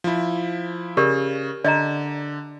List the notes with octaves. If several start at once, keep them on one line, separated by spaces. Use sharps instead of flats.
F3 E4
C#3 G4 A#4 D5
D3 D5 D#5 A#5